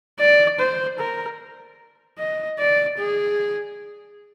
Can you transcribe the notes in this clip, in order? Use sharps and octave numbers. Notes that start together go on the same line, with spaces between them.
D5
C5
A#4
D#5
D5
G#4